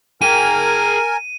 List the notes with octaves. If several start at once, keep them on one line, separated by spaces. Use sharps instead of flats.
G#4 A#4 G5 G#5 D#7